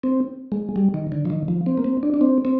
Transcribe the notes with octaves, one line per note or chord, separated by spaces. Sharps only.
C4
G#3
G3
D#3
D3
F3
D#3
F3
C4
A#3
C4
D4
D4
C4
C4